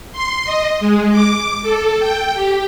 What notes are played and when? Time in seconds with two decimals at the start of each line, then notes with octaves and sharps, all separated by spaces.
0.12 C6
0.45 D#5
0.79 G#3
1.11 D6
1.62 A4
1.99 G5
2.34 G4